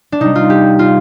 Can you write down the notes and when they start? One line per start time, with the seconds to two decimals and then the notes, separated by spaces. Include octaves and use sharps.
0.12 D4
0.20 C3 G3 D#4
0.35 F4
0.50 G4
0.79 F4